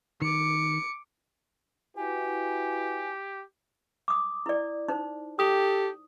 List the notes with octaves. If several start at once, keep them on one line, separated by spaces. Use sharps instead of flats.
D#3 D6 C#7
E4 F#4 G4 B4 G#5
D6 D#6
E4 D5
D#4 C5
G4 A4 D#6